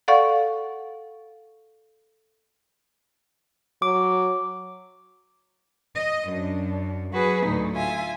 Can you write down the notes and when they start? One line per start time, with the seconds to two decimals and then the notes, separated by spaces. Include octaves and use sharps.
0.08 A4 D5 F5 F#5 C#6
3.82 F#3 D6
5.96 D#5
6.30 F#2 D4
7.14 F#3 F#4 G#4 B4
7.45 D2 A2 D#4
7.74 F4 E5 G#5